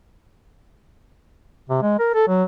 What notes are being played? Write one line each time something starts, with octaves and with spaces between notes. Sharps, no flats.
C3
G#3
A#4
A4
F#3